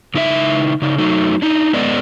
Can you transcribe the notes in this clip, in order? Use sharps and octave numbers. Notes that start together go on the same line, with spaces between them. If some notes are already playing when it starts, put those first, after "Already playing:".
C#3 D#4 E4 B4 E5
C#3 D#4
F#3 A3 D#4
D4 D#4
G#3 B3 A4 B4 D5 D#5